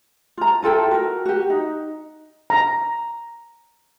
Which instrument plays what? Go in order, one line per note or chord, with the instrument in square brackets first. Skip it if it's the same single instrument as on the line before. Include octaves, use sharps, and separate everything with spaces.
[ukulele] F4 A#5
E4 F4 A4 G5
F#4 A#4
F#4 G4
D#4
[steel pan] A#5